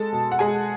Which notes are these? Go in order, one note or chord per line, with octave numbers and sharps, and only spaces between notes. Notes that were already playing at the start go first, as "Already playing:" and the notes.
Already playing: G#3 A4 A5
B2
F#5
G#3 G#4 G#5